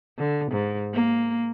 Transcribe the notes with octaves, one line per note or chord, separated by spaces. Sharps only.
D3
G#2
A#3